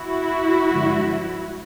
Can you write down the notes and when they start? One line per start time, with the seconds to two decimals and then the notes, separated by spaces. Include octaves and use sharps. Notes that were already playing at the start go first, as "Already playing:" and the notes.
Already playing: E4 F#4
0.70 G2 D3 F3 G#3